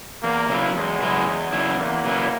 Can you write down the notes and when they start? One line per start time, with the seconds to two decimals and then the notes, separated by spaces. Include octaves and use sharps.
0.23 E2 A#3
0.49 C#3 F#3 B3 E4
0.76 E2 G#3
1.02 C#3 F#3 B3 E4
1.27 E2
1.53 C#3 F#3 B3 E4
1.79 E2 A#3
2.05 C#3 F#3 B3 E4